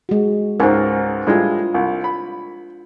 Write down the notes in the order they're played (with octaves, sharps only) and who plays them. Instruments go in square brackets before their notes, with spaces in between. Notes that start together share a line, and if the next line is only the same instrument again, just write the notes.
[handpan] G#3 F#4
[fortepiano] C#2 G#2 [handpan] A#4 C5
[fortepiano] A2 G3 G#3 [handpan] D4 F4
[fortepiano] C2
B5